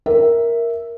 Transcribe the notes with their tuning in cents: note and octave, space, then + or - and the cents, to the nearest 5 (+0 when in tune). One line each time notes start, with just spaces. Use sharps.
A#4 +0 E5 +0